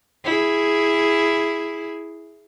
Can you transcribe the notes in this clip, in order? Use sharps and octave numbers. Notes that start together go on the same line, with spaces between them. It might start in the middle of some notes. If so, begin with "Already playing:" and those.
E4 G#4